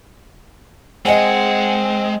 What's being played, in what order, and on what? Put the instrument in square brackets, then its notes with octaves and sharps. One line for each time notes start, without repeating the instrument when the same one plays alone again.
[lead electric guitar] G#3 [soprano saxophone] C4 [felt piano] D#5 G#5 [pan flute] F#5